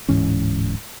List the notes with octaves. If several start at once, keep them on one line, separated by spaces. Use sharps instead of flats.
D1 G#2 E3 C#4